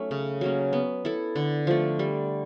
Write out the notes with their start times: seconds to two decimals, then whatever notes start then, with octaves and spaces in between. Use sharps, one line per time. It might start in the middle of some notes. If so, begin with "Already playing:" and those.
Already playing: F#3 A3 C#4 D#4
0.11 C#3
0.41 F#3 A#3 C#4
0.73 B3
1.05 E4 A4
1.36 D3
1.67 F3 A3
1.99 G3